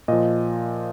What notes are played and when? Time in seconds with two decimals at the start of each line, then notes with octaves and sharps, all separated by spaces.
0.08 A#2 F3 D#5